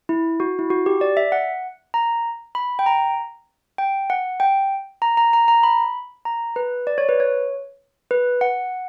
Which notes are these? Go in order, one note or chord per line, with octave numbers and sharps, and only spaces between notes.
E4
F#4
E4
F#4
G4
D5
E5
F#5
A#5
B5
G5
A#5
G5
F#5
G5
A#5
A#5
A#5
A#5
B5
A#5
B4
D5
C#5
B4
C#5
B4
F#5